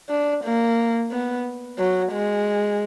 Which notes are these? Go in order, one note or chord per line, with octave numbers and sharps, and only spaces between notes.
D4
A#3
B3
F#3
G#3